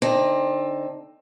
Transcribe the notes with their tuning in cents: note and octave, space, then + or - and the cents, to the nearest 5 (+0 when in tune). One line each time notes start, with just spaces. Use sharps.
D3 +0 C4 +20 D#4 +0